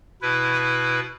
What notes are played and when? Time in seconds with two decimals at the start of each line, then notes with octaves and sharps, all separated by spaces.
0.22 B2 E4 B4